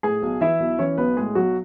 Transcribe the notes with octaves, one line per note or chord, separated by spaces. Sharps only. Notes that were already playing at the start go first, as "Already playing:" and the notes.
A2 G#4 G#5
B1
E3 E4 E5
B1
E3 C#4 C#5
B1 B3 B4
A2 G#3 G#4
B1 F#3 F#4